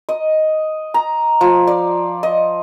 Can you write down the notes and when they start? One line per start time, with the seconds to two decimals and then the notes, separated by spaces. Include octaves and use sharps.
0.09 D#5
0.94 A#5
1.41 F3
1.67 D5
2.23 D#5